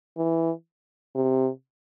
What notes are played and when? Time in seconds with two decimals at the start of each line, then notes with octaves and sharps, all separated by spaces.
0.17 E3
1.15 C3